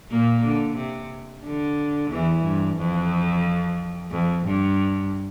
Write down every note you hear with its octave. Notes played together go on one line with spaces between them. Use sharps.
A#2 A#3
D3
C3
D3
E2 E3
G2
F2
F2
G2